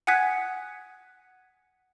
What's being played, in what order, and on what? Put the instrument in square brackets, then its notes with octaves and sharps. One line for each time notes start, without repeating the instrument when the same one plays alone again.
[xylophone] F#5 G#5 D#6 F#6 G#6 B6